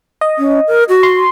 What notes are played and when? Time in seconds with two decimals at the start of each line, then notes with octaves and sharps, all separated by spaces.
0.21 D#5
0.38 C#4
0.67 A#4
0.89 F#4
1.03 C6